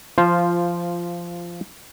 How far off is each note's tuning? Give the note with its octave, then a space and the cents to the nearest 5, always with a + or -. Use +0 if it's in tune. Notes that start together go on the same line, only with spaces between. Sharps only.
F3 -15 F4 +0 C5 +0